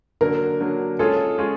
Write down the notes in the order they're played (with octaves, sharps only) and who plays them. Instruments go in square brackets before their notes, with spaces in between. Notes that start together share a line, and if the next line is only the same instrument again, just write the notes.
[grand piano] D3 F#3 A#3 D4 [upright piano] A#4
[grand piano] D3 F#3 A#3 D4
[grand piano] G#3 C#4 F4 G#4 C#5 [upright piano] A4
[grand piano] G#3 C#4 F4 G#4 C#5